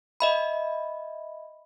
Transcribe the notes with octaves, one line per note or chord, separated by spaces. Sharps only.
D#5 E5 B5